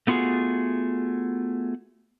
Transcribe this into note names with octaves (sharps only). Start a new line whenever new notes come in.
A3 B3 F4 F#4 G#4